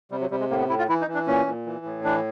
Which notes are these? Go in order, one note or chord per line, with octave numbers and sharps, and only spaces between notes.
C3 G3
F#3
C3 G3
G#3
A2 A#3
B3
A2 E4
F4
E3 E4
D#4
E3
D4
A#2 C#4
A#2
E3
A2
E3 D4